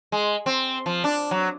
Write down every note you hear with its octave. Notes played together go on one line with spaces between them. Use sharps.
G#3
C4
F3
D4
F#3